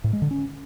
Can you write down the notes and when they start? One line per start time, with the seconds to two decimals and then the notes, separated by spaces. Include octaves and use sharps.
0.04 A2
0.13 G#3
0.22 D3
0.31 C#4